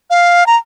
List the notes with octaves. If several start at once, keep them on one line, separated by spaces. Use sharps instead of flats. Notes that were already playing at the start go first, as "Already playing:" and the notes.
F5
A#5